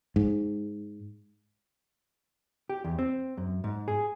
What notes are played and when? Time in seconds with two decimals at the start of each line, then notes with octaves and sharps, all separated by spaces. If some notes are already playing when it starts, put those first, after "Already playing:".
0.16 G#2
2.69 G4
2.84 E2
2.99 C4
3.37 F#2
3.64 G#2
3.88 G#4